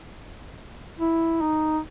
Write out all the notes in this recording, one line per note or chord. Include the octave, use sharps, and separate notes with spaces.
E4
D#4